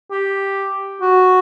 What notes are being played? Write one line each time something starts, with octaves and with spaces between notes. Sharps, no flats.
G4
F#4